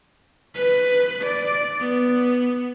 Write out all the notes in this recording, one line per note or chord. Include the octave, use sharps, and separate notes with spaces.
B4
D5
B3